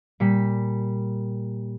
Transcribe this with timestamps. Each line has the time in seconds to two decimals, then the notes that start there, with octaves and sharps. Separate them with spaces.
0.20 A#2 G3 B6